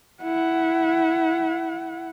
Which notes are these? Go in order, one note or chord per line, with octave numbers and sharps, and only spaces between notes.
E4 F#5